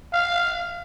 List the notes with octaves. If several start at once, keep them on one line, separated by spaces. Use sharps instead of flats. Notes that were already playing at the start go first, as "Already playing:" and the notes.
F5